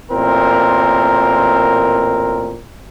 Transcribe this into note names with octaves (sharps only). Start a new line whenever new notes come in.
A1 A#2 C4 A#4